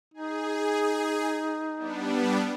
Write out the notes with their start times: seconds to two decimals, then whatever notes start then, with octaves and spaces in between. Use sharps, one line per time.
0.14 D#4 G#4
1.77 G3 B3 D4